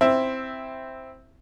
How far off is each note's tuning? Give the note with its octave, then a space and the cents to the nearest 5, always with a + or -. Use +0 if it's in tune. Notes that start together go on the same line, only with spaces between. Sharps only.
C4 +0 E4 +0 E5 +0